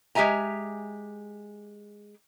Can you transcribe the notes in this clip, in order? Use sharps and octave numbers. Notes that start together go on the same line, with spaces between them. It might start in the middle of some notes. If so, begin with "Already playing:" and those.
G#3 G4 E5 G#5 A#5